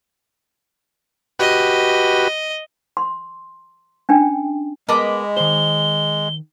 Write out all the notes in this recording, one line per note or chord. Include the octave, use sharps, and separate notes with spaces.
F#4 G4 B4 D#5
C6
C#4 D4 G5
G#3 B3 A#4 D#5 A5 B5 D6
D#3 C5 G7